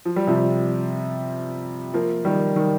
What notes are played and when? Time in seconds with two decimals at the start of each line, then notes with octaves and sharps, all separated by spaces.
0.05 F3
0.16 G3
0.27 C3 F3
1.94 F3 A#3
2.25 D#3 G3
2.56 D#3 G3